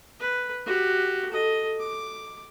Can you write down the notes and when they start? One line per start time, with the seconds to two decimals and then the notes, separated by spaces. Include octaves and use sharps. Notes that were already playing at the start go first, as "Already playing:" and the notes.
0.20 B4
0.66 F#4 G4
1.29 A4 D#5
1.80 D6